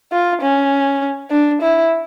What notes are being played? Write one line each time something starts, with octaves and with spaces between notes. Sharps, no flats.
F4
C#4
D4
E4